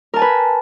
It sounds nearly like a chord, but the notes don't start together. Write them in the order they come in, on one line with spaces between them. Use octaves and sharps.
A#4 A5 G#5 B4